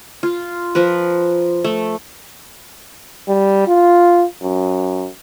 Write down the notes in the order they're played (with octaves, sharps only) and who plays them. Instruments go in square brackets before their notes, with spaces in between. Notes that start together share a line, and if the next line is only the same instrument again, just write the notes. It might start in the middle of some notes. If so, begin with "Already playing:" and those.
[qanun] F4
F3 A#4 B4
A3
[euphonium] G3
F4
F#2